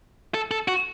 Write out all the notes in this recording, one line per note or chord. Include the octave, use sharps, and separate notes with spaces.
A4
A4
F#4